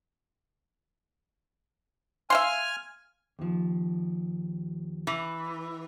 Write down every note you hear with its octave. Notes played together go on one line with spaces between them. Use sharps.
E5 F5 G#5 C6 F6
D#2 F3
E3